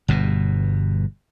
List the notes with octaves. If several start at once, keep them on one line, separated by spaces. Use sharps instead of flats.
G1 G2 B2